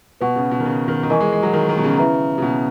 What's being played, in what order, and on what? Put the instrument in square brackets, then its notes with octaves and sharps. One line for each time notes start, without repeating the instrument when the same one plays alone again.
[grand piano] B2 [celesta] B4 F#5 C#6
[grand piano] C#3
B2
D#3
C#3
D#3
D#3
[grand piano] E3 [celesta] A#4 D#5 G#5 C#6
[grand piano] G#3
G#3
F#3
D#3
D#3
B2
C#3
[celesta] E4 B4 E5 A#5
[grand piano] C#3
B2